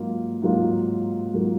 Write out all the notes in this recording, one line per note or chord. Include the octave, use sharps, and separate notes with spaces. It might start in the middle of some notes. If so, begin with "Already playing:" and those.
Already playing: G#2 F#3 A#3 F4
G#2 F#3 A#3 F4
G#2 F#3 A#3 F4